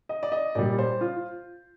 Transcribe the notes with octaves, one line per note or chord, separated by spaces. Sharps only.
D#5
D5
D#5
A#2 G3 D5
C5
F4